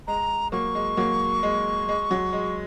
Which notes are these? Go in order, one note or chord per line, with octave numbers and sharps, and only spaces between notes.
G#3 A#5
F#3 A#3 C#6
G#3
F#3 A#3
G#3
G#3
F#3
G#3